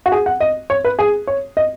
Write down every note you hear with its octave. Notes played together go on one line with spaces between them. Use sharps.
F#4
G#4
F#5
D#5
C#5
B4
G#4
C#5
D#5